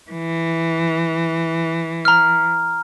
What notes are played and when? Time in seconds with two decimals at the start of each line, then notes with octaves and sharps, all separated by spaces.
0.12 E3
2.05 A#5 F6